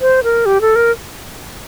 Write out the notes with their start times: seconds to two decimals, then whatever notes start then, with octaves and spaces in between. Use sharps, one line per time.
0.01 C5
0.23 A#4
0.46 G4
0.61 A4
0.76 A#4